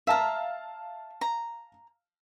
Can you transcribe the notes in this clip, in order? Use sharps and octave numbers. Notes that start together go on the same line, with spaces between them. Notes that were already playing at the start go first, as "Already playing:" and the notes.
E5 F5 A5 A#5 F6
A#5